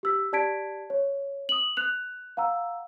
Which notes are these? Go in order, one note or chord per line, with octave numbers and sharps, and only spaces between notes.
G4 E6 B6
G4 D5 A5 G#6 B6 D7
C#5
D#6 F#7
F#6 F7
F5 F#5 A#5 E6